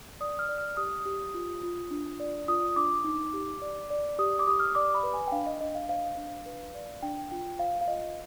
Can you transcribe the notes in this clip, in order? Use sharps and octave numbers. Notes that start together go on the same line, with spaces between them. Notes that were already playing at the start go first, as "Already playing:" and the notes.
D5 D#6
F6
D5
F6
G4 D#6
G4
F4
F4
D4
D5
F4 D#6
D4 D6
D#4
G4
D5
D5
G4 D#6
D6
G4 D#6
F6
D#6
D5 D6
B5
B4
G#5
G5
D4 F5
D#5
D4 D#5
F5
C5 F5
D4
B4
D5
D4 G5
F4 G5
C5 F5
F5
F4 D#5